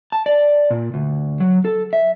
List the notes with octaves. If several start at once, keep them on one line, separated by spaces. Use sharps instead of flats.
A5
D5
A#2
D2
F#3
A4
E5